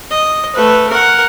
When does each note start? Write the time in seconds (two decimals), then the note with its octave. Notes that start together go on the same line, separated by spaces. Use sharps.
0.11 D#5
0.56 A3 B4
0.90 A#4 F#5